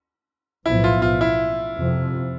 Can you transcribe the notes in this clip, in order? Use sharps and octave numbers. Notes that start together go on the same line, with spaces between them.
B1 A2 F3 B3 E4
F4
F4
E4
F2 C3 F3